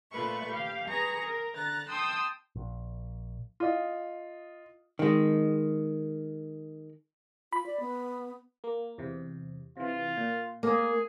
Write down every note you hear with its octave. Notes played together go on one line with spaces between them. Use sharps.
A#2 A3 F4 B4 E5 C#6
G4 F5
G#4 B4 A#5 C#6
A#4
D3 A#5 F#6 A6
G5 A5 C6 D#6 E6
A#1
F4 D#5
D#3 G#3
F4 B5
D5
B3
A#3
E2 C3
C3 E3 F4
A#2
A#3 G#4 F5